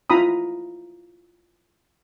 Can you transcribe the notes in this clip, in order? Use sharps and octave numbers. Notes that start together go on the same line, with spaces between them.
E4 F4 A#5 B5 D#6